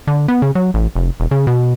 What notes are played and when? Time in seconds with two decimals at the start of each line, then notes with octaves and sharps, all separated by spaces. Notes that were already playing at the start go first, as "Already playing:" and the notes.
0.07 D3
0.28 B3
0.42 C#3
0.55 F#3
0.74 A1
0.95 F1
1.20 E1
1.31 C#3
1.47 B2